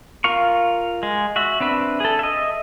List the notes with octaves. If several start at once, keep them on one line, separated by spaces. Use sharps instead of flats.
F4 A#4 F5 C#6
G#3
F#4 E5
C4 D4 B4 E5
G#4 A4
D#5 E5